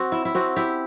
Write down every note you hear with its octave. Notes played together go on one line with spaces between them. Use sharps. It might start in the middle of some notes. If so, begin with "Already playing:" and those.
Already playing: C4 F#4
E4
E4
C4 F#4
E4 G4